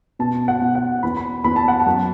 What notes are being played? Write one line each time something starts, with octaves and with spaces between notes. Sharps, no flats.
B2 A5
F#5
B2
F#5
E2 B5
B5
E2 B5
A5
F#5
A5
F#2